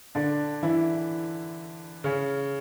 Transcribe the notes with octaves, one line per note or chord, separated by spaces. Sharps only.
D3 D4
E3 E4
C#3 C#4